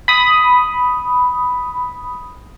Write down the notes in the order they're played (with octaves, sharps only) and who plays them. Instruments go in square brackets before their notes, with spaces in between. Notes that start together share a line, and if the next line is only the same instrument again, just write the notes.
[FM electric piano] B5 D#6